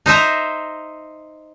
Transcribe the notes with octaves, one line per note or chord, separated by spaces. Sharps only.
D#4 C5 E5 A#5